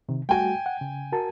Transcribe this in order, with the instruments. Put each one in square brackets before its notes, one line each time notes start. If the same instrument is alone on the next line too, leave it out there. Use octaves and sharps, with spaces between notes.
[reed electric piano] C3 D#3
[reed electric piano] G3 A3 F#4 [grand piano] G5 G#5
[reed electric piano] F#5
C#3
F#4 A#4 A5